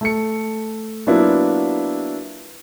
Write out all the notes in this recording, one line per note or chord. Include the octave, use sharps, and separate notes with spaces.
A3 A5 C#7
F#3 A#3 B3 D4 E4 F4